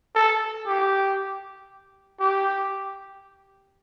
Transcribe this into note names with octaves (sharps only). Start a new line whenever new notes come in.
A4
G4
G4